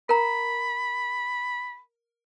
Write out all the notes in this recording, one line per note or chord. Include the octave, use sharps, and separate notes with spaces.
A#4 A#5 B5